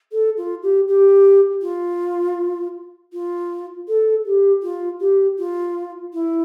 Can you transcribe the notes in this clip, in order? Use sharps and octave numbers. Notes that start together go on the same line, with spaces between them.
A4
F4
G4
G4
F4
F4
A4
G4
F4
G4
F4
E4